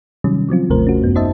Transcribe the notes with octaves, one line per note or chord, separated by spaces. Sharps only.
C3 D#3 F#3 G3 C#4
F3 F#3 C4 F4
G#1 D#2 C3 A3 A#4 C5
C#4 F#4
F#2 B3
D#4 C5 D#5 E5 A5